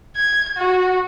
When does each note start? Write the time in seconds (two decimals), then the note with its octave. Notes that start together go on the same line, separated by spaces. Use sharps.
0.16 G#6
0.57 F#4